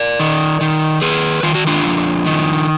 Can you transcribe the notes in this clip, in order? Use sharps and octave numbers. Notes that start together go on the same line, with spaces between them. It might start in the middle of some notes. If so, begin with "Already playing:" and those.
Already playing: A#4 D5
D#3
D#3
D#3 G#4 B4
D#3 F4
F#4
D4 F4
F2
D#3